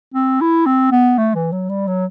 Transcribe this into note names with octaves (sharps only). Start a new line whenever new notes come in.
C4
E4
C4
B3
A3
E3
F#3
G3
F#3